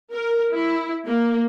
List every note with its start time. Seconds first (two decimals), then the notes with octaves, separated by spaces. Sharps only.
0.12 A#4
0.52 E4
1.07 A#3